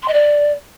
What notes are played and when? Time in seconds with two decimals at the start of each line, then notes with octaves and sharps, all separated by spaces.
0.02 C6
0.08 D#5
0.13 D5